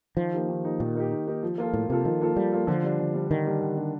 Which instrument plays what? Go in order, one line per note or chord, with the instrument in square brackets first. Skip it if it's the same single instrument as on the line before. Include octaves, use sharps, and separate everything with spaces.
[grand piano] D#3 [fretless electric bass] F3
[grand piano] A#3 D#4 G4
D#3
A#3 D#4 G4
[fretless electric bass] A#2 [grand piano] D#3
[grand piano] A#3 D#4 G4
D#3
A#3 D#4 G4
F3
A#3 F4 A4
[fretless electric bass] A2 [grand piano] F3
[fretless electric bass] C3 [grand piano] A#3 F4 A4
[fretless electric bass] D#3 [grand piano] F3
[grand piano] A#3 F4 A4
[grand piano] F3 [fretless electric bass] G3
[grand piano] A#3 F4 A4
[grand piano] D3 [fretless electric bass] F3
[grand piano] G3 D4
D3
G3 D4
[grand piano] D3 [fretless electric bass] D#3
[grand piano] G3 D4
D3
G3 D4